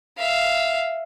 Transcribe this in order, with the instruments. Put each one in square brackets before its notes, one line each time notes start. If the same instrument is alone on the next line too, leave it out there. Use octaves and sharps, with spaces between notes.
[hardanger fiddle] E5 F5